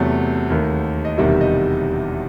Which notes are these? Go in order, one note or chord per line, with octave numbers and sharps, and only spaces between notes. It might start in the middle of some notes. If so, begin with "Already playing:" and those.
Already playing: E2 C3 F#3 A3 F#5
D#2 D#3 A3
D#5
E1 E2 C3 D#3 G3 E5
D#5